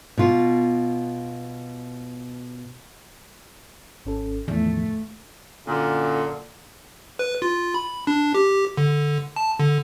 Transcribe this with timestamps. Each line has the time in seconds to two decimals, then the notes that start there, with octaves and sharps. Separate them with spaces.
0.18 B2 F4
4.05 G#1 C#4 A4
4.48 E2 A2 D#3 F3 A3
5.67 F#2 A#2 D3
7.19 B4
7.42 F4
7.74 B5
8.07 D4
8.34 G4
8.77 D3
9.36 A5
9.59 D3